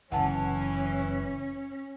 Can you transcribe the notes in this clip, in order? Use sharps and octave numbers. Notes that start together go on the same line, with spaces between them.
F#1 C3 E3 C#4 F#5 A5